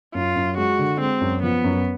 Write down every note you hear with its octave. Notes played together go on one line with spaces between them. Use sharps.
F#2 F4
F#2
G#3 F#4
D3
G#3 C4
F#2
F3 B3
F#2